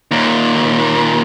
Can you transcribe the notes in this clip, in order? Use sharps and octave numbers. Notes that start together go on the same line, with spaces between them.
D#2 A#2